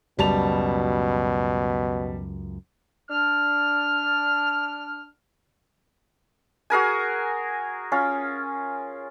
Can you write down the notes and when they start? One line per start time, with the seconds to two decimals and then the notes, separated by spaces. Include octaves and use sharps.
0.19 C#2 F#2 B2 G3 A5 F7
3.10 D4 F6
6.70 F#4 G#4 A#4 G#5
7.92 C#4 F4